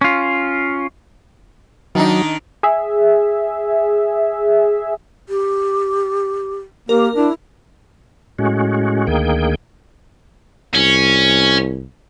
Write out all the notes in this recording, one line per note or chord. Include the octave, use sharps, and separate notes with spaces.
C#4 F4
D#3 F#3 D4 D#4
G#4 E5
G4
A#3 G4 A#4
D4 E4
A2 G#3 C#4 F#4
D2 D#3 A#3 G#4 G5
C2 C#4